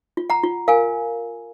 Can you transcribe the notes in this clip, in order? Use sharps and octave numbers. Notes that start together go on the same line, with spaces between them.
F4
F#5 A#5
F4
A#4 F5 G#5